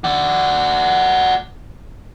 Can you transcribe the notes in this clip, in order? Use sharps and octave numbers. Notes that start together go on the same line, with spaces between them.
F#4 D5